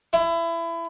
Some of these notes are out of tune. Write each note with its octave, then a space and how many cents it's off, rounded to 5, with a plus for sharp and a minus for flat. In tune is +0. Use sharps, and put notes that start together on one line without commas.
E4 +25